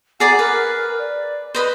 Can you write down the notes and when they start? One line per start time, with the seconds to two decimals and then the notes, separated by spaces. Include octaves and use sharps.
0.20 G#4 D5 F#5 A#5
0.39 A#4 B4
0.99 D5
1.55 B4 C5 D#5 B5